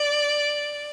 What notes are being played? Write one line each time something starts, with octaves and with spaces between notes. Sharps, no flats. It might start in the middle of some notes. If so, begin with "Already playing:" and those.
Already playing: D5